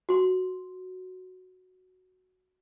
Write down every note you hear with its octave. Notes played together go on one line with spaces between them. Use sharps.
F#4 C6